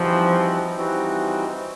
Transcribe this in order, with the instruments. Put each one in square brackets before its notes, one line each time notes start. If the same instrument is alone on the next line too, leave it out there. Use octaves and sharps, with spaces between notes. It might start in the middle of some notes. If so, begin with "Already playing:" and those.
Already playing: [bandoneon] E3 G3 C4 D#4 F#4 [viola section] F3
[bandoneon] E3 G3 C4 D#4 F#4